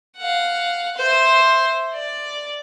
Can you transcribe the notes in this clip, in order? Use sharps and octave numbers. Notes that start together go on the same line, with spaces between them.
F5 F#5
C5 E5
D5